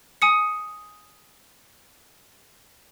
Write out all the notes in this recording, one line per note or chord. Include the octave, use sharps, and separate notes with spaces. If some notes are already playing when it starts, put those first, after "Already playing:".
G#5 D#6 C#7